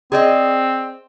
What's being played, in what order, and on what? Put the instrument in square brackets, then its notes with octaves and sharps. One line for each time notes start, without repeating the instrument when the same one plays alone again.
[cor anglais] C4 [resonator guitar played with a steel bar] G#4 D5 D#5